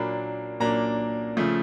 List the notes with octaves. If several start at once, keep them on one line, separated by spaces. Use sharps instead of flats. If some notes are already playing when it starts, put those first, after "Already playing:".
Already playing: A#2 F#3 A#3 D4 B5
A#2 F#3 A#3 D4 A#5
C#3 F3 A3